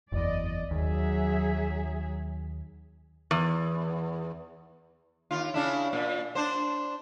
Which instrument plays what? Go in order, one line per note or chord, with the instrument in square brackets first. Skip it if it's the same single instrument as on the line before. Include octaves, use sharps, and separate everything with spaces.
[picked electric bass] F#1 E2 [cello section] D5 D#5
[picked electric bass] D#2 [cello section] F#3 G#4 E5
[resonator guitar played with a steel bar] E2
[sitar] D#2 F4
C#3 D4 E4
A#2
D4 C5